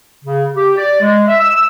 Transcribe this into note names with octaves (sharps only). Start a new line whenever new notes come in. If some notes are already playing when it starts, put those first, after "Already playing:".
C#3
G4
D5
G#3
E5
E6